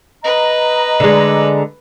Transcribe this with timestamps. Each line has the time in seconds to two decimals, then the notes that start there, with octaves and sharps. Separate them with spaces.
0.24 B4 D#5 A#5
1.00 D3 G#3